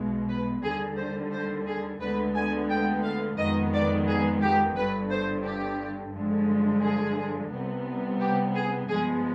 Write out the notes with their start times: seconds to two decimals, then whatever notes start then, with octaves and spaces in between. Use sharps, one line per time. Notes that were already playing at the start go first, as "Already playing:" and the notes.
Already playing: B1 B2 G#3
0.28 B4
0.62 D#2 D3 G3 G#4
0.96 C5
1.32 C5
1.66 G#4
2.00 D2 D3 G#3 B3 B4
2.34 G#5
2.69 G5
3.03 F5
3.37 F2 D#3 G#3 B3 D#5
3.73 D5
4.07 G#4
4.42 G4
4.75 G1 G2 D3 B4
5.10 C5
5.44 G4
6.12 G2 D3 F3 G#3
6.81 G#4
7.51 C2 C3 G3 B3
8.20 G4
8.54 G#4
8.88 G2 F3 G#3 B3 G#4